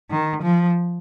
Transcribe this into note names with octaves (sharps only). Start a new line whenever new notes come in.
D#3
F3